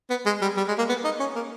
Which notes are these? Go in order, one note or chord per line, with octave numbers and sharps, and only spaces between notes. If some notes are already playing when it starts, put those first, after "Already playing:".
B3
G#3
G3
G3
G#3
A#3
B3
D#4
C#4
A#3